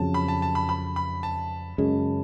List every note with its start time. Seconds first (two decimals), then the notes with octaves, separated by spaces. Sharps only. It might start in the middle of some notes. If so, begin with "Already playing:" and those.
Already playing: F2 C#3 F#3 A5
0.14 B5
0.28 A5
0.42 A5
0.55 B5
0.69 B5
0.96 B5
1.23 A5
1.78 F#2 C#3 G#3